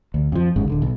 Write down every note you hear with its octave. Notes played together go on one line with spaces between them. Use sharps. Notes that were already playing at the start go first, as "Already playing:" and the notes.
D2
F2 F3
G1 C#2 G#2 C#3
D1 D3
B1